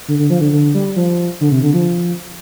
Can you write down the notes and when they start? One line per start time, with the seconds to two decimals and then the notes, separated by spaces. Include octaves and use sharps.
0.08 D3
0.19 D3
0.30 F3
0.41 D3
0.53 D3
0.75 G3
0.96 F3
1.41 D3
1.52 C3
1.63 D3
1.74 F3